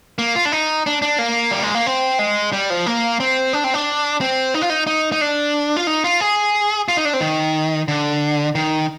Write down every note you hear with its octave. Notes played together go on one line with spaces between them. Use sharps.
A#3
F4
D4
D#4
D4
D4
A#3
G3
G#3
A#3
C4
G#3
G3
F3
A#3
C4
D4
C4
D4
C4
D#4
F4
D#4
D#4
D#4
D4
F4
D#4
F4
G#4
F4
D#4
D4
C4
D#3
D3
D#3